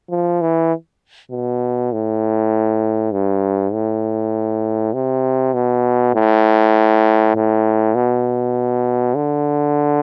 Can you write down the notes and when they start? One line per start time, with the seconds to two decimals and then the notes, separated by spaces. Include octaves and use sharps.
0.10 F3
0.41 E3
1.31 B2
1.93 A2
3.12 G2
3.73 A2
4.94 C3
5.54 B2
6.14 A2
7.36 A2
7.95 B2
9.16 D3